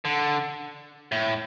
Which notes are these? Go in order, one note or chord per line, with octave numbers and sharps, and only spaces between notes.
D3
A2